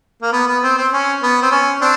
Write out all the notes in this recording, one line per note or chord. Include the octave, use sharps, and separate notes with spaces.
A#3
B3
B3
C4
C4
C#4
B3
C4
C#4
C4 D4